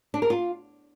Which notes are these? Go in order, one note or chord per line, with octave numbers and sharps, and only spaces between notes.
D4
A#4
F4